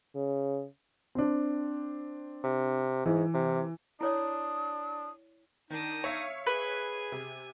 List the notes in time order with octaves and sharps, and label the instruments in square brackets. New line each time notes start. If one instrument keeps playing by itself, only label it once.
[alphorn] C#3
[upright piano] C4 D4
[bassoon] C3
[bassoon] G#2 [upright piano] E3
[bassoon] C3
[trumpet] D4 [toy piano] E4 C#5 D5 [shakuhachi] D#6
[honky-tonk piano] D#3 [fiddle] D4 D#6 [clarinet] D#4
[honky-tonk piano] C#5 E5 F5
[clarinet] G#4 [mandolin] B4 [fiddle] G#5
[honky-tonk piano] C3